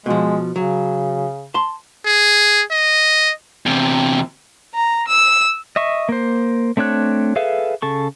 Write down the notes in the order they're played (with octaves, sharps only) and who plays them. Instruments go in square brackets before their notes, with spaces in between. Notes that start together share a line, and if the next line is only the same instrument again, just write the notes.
[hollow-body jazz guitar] B2 F3 [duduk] G#3
[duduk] C#3 [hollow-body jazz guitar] F#3
[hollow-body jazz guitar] A5 C6
[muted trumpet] G#4
D#5
[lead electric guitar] E2 C3
[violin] A#5
E6
[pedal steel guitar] D#5 E5 C#6
A#3 C5
A3 C4 D4 C#5 F#6
G#4 A4 B4 E5 F5
C#3 A4 C#6